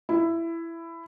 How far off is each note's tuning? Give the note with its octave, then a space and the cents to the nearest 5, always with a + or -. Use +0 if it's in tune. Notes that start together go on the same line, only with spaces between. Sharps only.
E4 +15